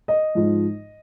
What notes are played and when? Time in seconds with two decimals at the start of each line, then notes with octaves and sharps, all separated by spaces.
0.08 D#5
0.35 G#2 F3